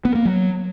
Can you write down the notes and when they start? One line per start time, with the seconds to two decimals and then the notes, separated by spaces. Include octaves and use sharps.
0.05 B3
0.15 A#3
0.25 F#3